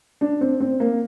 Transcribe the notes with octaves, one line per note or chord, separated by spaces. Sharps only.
D4
C4
C4
A#3